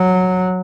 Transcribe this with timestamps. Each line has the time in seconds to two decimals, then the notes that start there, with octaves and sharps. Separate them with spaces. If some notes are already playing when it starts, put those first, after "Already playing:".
Already playing: F#3